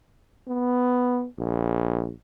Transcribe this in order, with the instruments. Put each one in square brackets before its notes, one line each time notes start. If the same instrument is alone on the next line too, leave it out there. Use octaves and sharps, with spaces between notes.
[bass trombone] B3
A#1